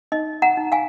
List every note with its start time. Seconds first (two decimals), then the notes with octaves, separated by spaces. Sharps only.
0.12 D#4 D#5
0.42 F#5 A#5
0.57 D#4
0.72 F5 G#5